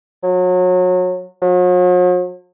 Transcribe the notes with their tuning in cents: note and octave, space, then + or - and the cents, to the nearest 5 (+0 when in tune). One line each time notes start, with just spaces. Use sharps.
F#3 -30
F#3 -45